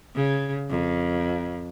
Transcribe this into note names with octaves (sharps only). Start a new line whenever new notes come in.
C#3
F2